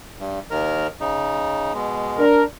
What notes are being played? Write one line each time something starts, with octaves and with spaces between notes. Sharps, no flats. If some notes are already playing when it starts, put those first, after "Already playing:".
G2
D#2 D#3 A#4
C#3 D#4
B2 G#3
D4 A#4